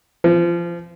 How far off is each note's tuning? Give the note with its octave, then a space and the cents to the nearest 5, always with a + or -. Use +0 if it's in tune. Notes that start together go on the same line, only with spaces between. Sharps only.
F3 -25